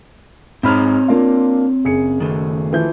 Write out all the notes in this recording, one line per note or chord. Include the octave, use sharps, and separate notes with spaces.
G#2 C4 C#5 A#5 B5 F6
A#3 D4 F4
F#1 G#4 C#7
D#3 A3
E3 F3 G6